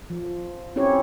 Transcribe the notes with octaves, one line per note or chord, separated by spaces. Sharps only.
F3
C4 C#4 E4 G4 C#5